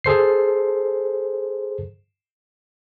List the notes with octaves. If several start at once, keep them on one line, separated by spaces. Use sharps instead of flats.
G#4 A4 C5 C7